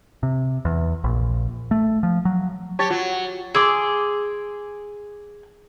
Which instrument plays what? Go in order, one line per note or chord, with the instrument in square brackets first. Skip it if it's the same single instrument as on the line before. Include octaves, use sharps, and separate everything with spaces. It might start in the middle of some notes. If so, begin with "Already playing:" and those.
[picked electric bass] C3
E2
A#1
A3
F3
F#3
[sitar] G4 C#5 [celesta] A5 C#6 A6
[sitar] F#3 [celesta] F4
[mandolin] G#4 [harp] C6 D6 E6